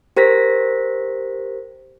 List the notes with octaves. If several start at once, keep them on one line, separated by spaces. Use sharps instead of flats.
G4 A#4 C5 A#6 B6